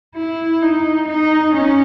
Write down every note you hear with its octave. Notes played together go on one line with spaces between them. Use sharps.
E4
D#4
D#4
C#4